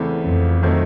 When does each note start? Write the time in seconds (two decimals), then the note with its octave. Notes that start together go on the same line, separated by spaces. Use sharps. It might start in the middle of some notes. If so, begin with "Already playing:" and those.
Already playing: E2 C#3 E3 A3 C4
0.22 F2
0.63 D#3 F#3 A3 C4